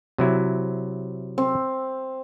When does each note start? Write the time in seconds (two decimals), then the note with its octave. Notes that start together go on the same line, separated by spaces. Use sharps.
0.18 C3 F#3 E4
1.38 C4